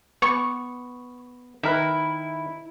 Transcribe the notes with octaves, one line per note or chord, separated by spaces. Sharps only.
B3 C#6
D#3 E4 A#4 B4